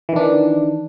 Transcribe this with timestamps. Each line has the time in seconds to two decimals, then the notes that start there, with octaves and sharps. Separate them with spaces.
0.09 E3
0.12 D#3
0.16 D4